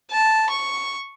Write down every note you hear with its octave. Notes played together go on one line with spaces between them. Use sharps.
A5
C#6